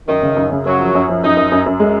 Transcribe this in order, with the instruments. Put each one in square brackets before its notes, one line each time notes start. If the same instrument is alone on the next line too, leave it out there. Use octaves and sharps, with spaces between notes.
[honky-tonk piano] F#2 [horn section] D#3
[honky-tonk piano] C#3
F#2
C#3
[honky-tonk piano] F#2 [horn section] F#3
[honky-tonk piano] F3
F#2
F3
[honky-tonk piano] F#2 [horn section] D#4
[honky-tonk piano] F#2
F#2
F#2
G#3